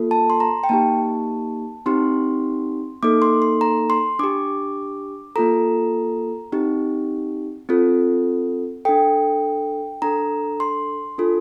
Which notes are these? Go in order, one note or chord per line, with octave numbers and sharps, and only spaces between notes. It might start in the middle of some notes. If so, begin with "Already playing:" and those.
Already playing: A#3 F4 A4
A5
C6
A#5
G5
A#3 D#4 G4 A5
C4 D#4 G4 C6
A#3 D#4 A4 D6
C6
C6
A#5
C6
D4 G4 D6
A#3 F4 A4 A#5
C4 D#4 G4
C4 F4 A4
D4 A4 G5
D4 A4 A#5
C6
D4 F4 A4